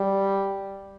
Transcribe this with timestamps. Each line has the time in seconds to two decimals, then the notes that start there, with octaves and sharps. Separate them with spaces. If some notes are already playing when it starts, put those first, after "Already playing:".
Already playing: G3